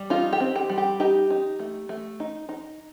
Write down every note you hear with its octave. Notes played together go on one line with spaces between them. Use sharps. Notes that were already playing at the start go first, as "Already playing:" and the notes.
Already playing: G3
D#4 F4
G4
C4
G4
G3
G4
D#4 G4
D#4
A3
A3
D#4
D#4